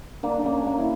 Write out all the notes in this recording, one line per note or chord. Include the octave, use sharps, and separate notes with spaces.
A#3 D4
D4
A#3 C#4
A#3 C#4
E4